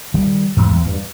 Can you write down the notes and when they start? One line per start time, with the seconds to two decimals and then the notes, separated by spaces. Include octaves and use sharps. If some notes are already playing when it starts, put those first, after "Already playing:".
0.14 D#3 G3
0.57 E2 G#2
0.71 E2
0.86 G2